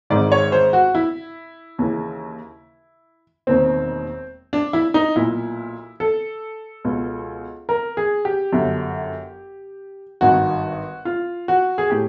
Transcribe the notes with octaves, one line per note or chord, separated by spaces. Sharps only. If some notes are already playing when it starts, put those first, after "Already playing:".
G#1 G#2 D#3 D5
C#5
C5
F#4
E4
D#2 C#3 E3
E1 D#2 D#3 C4
D4
E4
D#4
B1 A#2 E4
A4
C#2 B2
A#4
G#4
G4
G1 F#2 D3
G#1 G2 D#3 F#4
F4
F#4
G#4
A2 G4